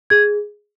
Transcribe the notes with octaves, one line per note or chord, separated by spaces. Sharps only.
G#4 G#6